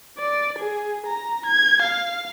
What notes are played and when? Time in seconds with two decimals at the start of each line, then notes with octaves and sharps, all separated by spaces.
0.18 D5
0.59 G#4
1.06 A#5
1.46 G#6
1.82 F5